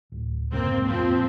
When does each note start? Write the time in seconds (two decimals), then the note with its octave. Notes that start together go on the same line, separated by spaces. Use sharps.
0.12 D1
0.52 F1 C#2 G#2 A#3 C4
0.86 F2 A#2 F3 C4